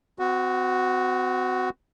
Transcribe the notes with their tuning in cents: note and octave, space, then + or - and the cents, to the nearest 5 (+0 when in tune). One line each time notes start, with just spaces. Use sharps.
C4 -40 F#4 +0